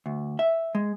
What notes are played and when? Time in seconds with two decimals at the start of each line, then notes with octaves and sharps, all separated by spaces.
0.06 D2
0.39 E5
0.75 G#3